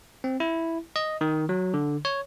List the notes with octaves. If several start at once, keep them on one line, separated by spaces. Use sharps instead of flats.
C4
E4
D#5
D#3
F#3
D3
C#5